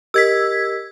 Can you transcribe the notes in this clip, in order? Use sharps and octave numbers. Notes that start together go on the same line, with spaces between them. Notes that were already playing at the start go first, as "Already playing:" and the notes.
G4 A#4 D#5 E6 G#6 B6